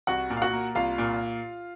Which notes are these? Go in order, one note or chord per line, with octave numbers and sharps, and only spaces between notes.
C2 F#4 F#5
A#2
F5
F#4 F#5
A#3
C2 F4 F5
A#2